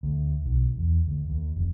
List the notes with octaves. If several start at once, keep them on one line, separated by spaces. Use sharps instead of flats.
D2
B1
E2
D2
D#2
F1